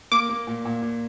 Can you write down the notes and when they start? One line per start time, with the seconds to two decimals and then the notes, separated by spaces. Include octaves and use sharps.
0.12 A#3 D6
0.29 A#3
0.47 A#2
0.65 A#2
0.82 A#2